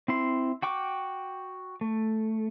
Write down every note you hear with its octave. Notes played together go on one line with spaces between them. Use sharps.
C4 E4 C6
F#4 G5 C#6 D6
A3